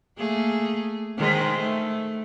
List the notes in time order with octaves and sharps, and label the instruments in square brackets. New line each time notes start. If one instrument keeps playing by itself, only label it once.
[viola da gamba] A3 A#3 G#4
D#3 G#3 C5
A3